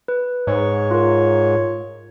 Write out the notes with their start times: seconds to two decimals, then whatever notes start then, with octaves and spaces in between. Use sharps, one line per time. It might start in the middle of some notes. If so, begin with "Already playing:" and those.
0.08 B4
0.47 G#2 C#5
0.91 F4 A#4